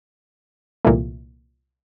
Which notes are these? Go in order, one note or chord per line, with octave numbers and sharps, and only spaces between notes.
C2 A#2 E3 A3